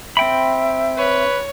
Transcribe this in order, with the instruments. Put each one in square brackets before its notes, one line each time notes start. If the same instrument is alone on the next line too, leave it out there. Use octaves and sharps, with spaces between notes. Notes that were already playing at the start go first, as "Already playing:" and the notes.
[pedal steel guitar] C4 G5 B5 [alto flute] E5
[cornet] B4 [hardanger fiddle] C#5